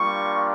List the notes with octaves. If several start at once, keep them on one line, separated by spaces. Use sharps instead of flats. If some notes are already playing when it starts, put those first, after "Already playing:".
Already playing: G3 A#3 D4 F4 C#6